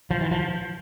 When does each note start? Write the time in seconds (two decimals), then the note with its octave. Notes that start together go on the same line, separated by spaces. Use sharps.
0.11 F3
0.21 E3
0.31 F3